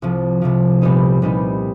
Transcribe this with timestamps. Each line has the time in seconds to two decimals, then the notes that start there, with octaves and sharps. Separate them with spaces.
0.02 C2 C3 F3
0.41 C2 C3 F3
0.82 C2 A#2 G3 B3 D#4
1.22 C2 A#2 G3 B3 D#4